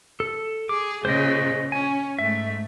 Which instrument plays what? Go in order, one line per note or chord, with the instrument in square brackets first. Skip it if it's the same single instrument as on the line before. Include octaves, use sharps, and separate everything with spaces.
[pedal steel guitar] A4
[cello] G#4 [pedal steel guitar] D6
[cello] A#2 C#3 [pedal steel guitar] C5 D#5
[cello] C#4 [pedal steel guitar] G#5
[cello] G#2 A3 [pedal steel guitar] E5